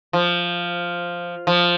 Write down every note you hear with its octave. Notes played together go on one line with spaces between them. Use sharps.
F3
F3